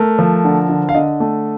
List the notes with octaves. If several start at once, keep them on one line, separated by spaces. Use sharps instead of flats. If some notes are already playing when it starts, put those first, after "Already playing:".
Already playing: A3 A#4
F3
D3
D3
F5
D3 D#5
A3